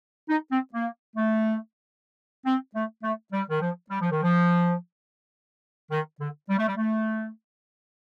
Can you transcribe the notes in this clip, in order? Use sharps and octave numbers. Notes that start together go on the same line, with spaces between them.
D#4
C4
A#3
A3
C4
A3
A3
G3
D#3
F3
G3
F3
D#3
F3
D#3
D3
G3
A3
G3
A3